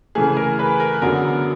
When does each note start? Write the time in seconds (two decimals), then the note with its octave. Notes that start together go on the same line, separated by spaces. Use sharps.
0.15 C#3 E3 A3 G#4
0.37 A#4
0.59 B4
0.80 A#4
1.02 F#2 D3 F#3 B3 A#4